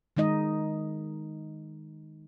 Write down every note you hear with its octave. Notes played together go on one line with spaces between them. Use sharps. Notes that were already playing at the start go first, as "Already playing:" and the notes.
D#3 G#3 D#4 D#5